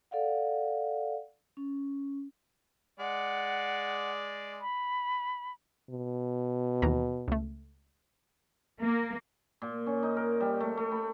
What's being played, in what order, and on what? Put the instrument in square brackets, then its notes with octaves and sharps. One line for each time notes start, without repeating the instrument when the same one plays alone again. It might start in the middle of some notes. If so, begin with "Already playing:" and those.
[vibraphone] A4 D5 F5 F#5
C#4
[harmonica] G#3 D5 [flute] F#5
[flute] B5
[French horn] B2
[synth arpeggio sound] D#2 E3 A#5
C#2 A3
[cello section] A#3
[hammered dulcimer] A#2
C#4
D#4
A#4
G3
A3
A3
B5